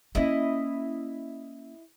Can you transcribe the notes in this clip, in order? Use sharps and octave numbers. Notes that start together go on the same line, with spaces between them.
A#3 C#4 E4 D#5